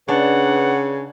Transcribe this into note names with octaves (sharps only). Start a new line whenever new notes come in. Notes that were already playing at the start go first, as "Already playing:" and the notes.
C#3 D4 B4 F#5